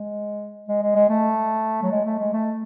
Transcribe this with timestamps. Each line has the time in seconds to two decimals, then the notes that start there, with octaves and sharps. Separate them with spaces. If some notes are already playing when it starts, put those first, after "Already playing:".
Already playing: G#3
0.68 G#3
0.82 G#3
0.95 G#3
1.09 A3
1.83 F#3
1.91 G#3
2.05 A3
2.19 G#3
2.33 A3